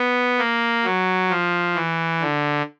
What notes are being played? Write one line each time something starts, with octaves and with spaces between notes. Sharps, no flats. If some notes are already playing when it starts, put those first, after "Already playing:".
Already playing: B3
A#3
F#3
F3
E3
D3